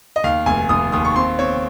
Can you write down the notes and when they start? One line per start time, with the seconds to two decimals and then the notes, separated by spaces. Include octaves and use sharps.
0.16 D#5
0.24 D#2 F5
0.46 F1 G#5
0.69 F1 D#6
0.92 D#2 D#6
1.05 C#6
1.16 C4 C6
1.39 C4 C#5